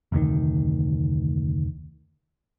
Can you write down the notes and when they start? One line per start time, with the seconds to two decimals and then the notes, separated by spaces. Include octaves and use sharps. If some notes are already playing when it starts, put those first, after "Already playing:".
0.12 F1 D2 D#3